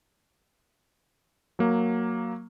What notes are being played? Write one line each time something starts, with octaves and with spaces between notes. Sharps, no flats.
F#3 A#3